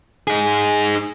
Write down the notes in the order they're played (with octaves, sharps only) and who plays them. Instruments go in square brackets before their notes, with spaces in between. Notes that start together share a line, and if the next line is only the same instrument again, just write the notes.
[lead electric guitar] D#4 G#4